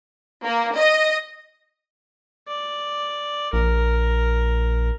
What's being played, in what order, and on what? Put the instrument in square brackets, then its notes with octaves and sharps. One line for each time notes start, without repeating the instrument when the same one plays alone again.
[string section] A#3
D#5
[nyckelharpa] D5
[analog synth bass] A#1 [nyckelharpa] A#4